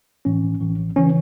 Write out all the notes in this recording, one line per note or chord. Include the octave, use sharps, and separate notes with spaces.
A1 A2 E3 C#4
A1 A2 E3
G#1 C#3 E3 C#4